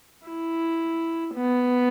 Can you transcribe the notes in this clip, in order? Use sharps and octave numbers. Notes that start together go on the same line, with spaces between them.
E4
B3